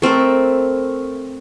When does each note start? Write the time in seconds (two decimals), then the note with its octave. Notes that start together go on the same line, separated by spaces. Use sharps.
0.02 A3 C4 A4 A#4